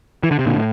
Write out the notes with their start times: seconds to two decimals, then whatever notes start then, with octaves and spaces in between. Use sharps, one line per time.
0.23 E3
0.31 D3
0.39 C3
0.46 A#2 D3
0.56 A2